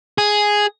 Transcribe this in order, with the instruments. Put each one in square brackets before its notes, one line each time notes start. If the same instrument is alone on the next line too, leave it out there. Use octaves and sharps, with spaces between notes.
[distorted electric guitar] G#4